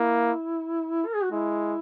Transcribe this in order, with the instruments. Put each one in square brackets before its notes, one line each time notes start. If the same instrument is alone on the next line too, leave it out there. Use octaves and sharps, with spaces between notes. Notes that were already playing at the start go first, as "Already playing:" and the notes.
Already playing: [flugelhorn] A#3 [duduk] E4
[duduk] A#4
G#4
F#4
[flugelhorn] G#3 [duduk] E4